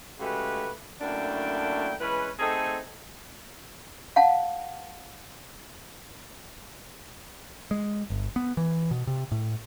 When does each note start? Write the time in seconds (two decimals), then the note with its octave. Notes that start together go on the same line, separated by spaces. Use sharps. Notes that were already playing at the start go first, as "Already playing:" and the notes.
0.19 C#3 G#3 A3 F#4 G4 B4
1.01 F#2 A3 A#3 D4 E4 G5
2.01 E3 G#3 C#4 B4
2.39 A3 C4 D#4 G#4 A4
4.16 F5 F#5 A5
7.71 G#3
8.10 G1
8.36 B3
8.57 E3
8.91 B2
9.07 C3
9.32 A2